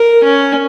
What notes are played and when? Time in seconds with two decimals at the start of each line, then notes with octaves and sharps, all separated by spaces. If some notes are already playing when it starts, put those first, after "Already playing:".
Already playing: A#4
0.23 C#4